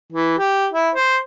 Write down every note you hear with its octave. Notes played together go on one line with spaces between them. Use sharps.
E3
G4
E4
C5